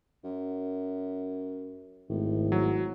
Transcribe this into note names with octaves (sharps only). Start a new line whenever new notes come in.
F#2
G#1 A2
F#3